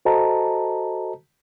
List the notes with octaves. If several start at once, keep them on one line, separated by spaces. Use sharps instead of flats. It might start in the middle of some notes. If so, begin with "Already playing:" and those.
F#4 A4 C5 D#5 A5 A#5